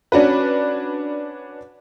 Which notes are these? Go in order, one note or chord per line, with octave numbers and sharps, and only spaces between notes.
C#4 D4 F#4 B4